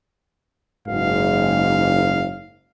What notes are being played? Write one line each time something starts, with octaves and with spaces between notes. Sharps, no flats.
F#1 G#2 F5